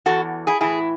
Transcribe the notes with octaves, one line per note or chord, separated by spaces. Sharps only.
E2 C#3 E3 F#4 A4
E4 G#4
A2 E3 E4 G#4